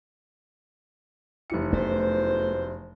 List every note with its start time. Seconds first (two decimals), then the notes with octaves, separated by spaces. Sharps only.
1.50 F1 E3 C#7
1.73 F#2 B2 A3 C5